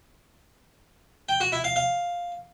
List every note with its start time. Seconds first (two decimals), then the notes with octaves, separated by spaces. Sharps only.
1.29 G5
1.40 F#4
1.52 E4
1.64 F5
1.76 F5